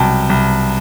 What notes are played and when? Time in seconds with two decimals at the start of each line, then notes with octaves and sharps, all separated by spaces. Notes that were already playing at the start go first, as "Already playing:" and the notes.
Already playing: C2 B2 F#3 G5 A5
0.30 C2